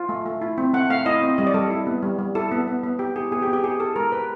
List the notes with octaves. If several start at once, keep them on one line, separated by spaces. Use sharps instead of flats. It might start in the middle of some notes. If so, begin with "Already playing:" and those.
Already playing: F4
A3
A3
E4
C4
A3 F#5
A3 F5
E4 D#5
C4
G3 D#5
D5
G3 A4
E4
B3
G3
G3
E4 A4
B3
B3
B3
G4
E4 G#4
B3 G#4
G4
B3
G4
G4 G#4
E4 A4
G#3 A#4
G4 B4